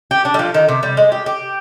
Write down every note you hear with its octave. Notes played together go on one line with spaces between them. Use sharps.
G4
D4
G3
F3
D#3
C3
G3
G#3
G4
G4